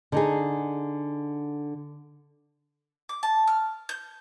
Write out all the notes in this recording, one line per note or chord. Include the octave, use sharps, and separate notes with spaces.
D3 D#4 G#4
D6
A5
F6
G6